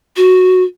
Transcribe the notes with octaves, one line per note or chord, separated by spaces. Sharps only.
F#4